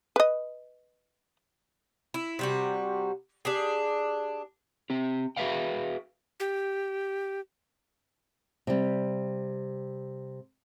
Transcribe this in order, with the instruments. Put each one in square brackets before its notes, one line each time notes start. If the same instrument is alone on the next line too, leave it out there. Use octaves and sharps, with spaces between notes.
[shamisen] B4 D#5
[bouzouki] E4
C3 G3 F#4
D4 G4 G#4
[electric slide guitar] C4 G4
F#4 G#4 B4 E5 F5 G5
[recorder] G4
[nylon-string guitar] C3 G3